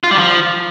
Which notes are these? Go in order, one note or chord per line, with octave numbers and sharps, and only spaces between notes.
F4
G3
F3